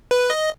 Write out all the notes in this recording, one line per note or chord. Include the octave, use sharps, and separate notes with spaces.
B4
D#5